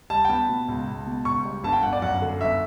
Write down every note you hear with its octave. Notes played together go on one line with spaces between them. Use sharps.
G3 A5
G5
B3 A5
B2
C#2
C#2
B2
C#2 C#6
G3
G1 A5
G5
G1 F#5
D5
F#2 F#5
D3
G1 E5